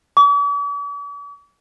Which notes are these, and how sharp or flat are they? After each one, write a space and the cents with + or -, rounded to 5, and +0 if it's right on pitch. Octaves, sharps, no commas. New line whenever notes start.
D6 -45